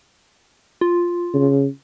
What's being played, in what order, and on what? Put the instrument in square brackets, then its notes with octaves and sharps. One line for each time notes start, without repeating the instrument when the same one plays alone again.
[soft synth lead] F4
[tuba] C#3